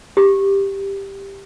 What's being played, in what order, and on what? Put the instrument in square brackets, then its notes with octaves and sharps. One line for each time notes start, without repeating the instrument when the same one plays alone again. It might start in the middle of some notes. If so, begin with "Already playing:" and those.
[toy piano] G4